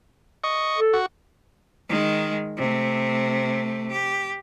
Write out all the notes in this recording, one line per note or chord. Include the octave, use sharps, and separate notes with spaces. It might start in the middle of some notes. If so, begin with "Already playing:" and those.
D#5 C#6
A4
F#4
D#3 G#3
C3 A3
G4